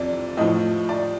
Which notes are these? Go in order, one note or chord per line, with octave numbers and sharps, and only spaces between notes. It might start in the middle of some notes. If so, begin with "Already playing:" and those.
Already playing: F2 C3 F3 D5
A2 F3 D#5
D5